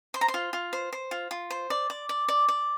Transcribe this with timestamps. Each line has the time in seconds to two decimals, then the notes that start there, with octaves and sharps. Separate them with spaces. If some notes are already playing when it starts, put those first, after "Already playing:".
0.14 C5 C6
0.21 A#5
0.28 C6
0.34 F4
0.53 F4
0.73 C5
0.93 C5
1.11 F4
1.31 F4
1.50 C5
1.70 D5
1.90 D5
2.09 D5
2.28 D5
2.48 D5